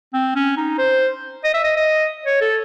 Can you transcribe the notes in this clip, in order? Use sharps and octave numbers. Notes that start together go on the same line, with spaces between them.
C4
C#4
D#4
C5
D#5
E5
D#5
D#5
C#5
A4